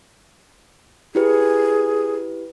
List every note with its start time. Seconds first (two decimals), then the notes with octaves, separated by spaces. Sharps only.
1.15 E4 G4 G#4 B4